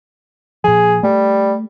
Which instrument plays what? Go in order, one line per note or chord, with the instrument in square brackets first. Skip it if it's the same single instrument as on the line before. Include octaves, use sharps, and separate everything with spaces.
[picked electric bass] A#2 F3 [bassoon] G#4
[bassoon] G3 [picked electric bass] A3